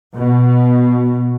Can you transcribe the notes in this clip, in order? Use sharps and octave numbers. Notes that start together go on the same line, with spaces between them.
B2